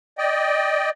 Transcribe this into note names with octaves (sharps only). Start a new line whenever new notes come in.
D5 D#5 G5